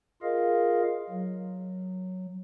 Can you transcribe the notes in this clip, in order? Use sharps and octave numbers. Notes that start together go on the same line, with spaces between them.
F4 G#4 A#4 D#5 F5
F#3